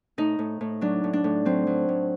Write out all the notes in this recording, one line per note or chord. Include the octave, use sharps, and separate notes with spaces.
A2 D#4
A2
A2
F#3 D4
A2
D4
A2
F#3 C4
F#3
A2